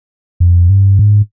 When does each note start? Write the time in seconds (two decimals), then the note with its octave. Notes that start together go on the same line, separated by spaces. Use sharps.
0.40 F2
0.69 G2
0.99 G#2